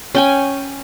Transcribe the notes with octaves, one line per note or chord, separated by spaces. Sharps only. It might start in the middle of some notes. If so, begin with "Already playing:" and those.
C#4 G5 G#5